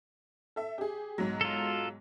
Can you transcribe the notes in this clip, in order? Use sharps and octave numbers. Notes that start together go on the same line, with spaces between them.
A4 E5
G4 G#4
B1 G#2 F#3
F4 A4